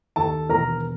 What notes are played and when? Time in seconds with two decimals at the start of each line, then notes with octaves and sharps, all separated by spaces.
0.16 D#2 A4 A5
0.49 E1 A#4 A#5